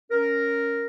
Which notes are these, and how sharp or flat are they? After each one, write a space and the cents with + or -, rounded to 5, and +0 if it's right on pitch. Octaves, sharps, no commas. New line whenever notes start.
C#4 +0 A#4 +0